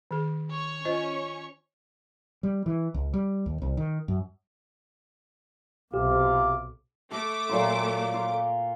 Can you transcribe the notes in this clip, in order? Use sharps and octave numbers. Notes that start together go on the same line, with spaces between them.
D#3 G#4
C#5 C#6
C#4 F4 C5 D#5
G3
E3
C#2
G3
D#2
C2
D#3
F#2
B1 C3 F4 G4 D6
A3 A4 D6
A#2 F#3 C6
F4